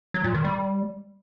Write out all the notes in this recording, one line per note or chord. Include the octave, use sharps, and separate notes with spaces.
F#3
A#2
D#3
G3